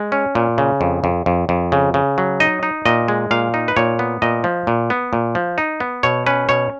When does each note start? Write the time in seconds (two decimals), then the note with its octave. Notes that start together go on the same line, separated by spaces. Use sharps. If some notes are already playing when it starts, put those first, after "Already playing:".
Already playing: G#3
0.12 C#4
0.35 A#2
0.58 C#3
0.81 F2
1.04 F2
1.26 F2
1.49 F2
1.72 C#3
1.94 C#3
2.18 F#3
2.40 D#4 D#5
2.63 D#4
2.86 A#2 D#5
3.08 G#3
3.31 A#2 F5
3.54 D#4
3.68 B4
3.77 A#2 C#5
3.99 B3
4.22 A#2 D#5
4.44 F3
4.67 A#2
4.90 B3
5.13 A#2
5.35 F3
5.58 D#4
5.80 B3
6.03 B2 C#5
6.26 C#4 B4
6.49 B2 C#5